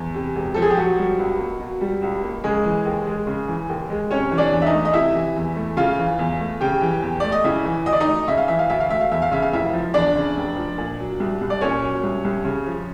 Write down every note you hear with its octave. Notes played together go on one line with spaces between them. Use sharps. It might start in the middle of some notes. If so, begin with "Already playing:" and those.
Already playing: E2
C3
E1
F3 A4
G#4
G4
B2 F#3 F#4
G3
C#2
A#3
B2
G3
C#2
A#3
C#3 G#3 G#4
E3
D#2
G#3
C#3
E3
D#2
G#3
C3 C#4 C#5
E3
D4 D5
E2
E5
D#4 D#5
A3
D#5
C3 E4 E5
E3
E2
A3
C#3 F4 F5
E3
E2
A3
C#3 G4 G5
E3
E2
A3 D5
D#5
C#3 E4 E5
E3
D2 D#5
D5
D#4 D#5
A3
C#3 E5
F5
E3 E5
F5
D2 E5
F5
A3 E5
F5
E2 E5
F5
C#3 E5
F5
F1 E4 E5
F3
E2 D4 D5
C#3
F1
F3
A#2
F#3
C2
C2
D5
A#2 C#4 C#5
F#3
C2
C2
C#3
F3